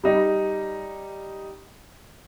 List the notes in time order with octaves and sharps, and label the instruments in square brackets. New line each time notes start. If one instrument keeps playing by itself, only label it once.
[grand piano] G3 D#4